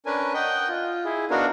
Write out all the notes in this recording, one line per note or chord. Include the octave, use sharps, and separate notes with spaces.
C#4 D4 A#4 B4 G#5
D#5 F#5 G5 G6
F4
E4 G#4
B3 D4 D#4 F#4 A#4 F5